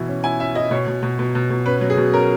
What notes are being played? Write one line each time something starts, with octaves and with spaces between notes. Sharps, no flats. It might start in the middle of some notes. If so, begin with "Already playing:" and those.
Already playing: B2 E3 E4
C#4
E4 G#5
C#4 E5
E4 D#5
B2 C#5
B2
B2
B2
B2
B2
C#4 B4
F#3
G#4
B2
C#4 A#4